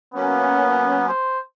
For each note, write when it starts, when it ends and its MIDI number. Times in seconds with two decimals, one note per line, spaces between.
0.14 1.11 54
0.14 1.11 58
0.14 1.08 59
0.14 1.11 61
1.09 1.40 72